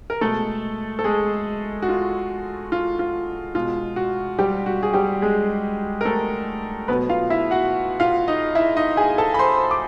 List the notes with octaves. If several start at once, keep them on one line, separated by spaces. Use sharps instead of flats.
A#4
B2 G#3 A3 A4
A4
G#3 G#4
F#4
F4
F4
F4
B2 G#3 F4
F#4
G3 G4
F#4
G#4
G3 G4
G#3 G#4
A#4
A3 A4
B2 F#3 A3 B3 B4
F4 F5
E4 E5
F#4 F#5
F4 F5
D#4 D#5
E4 E5
D#4 D#5
G#4 G#5
A4 A5
B5
C5 C6
D6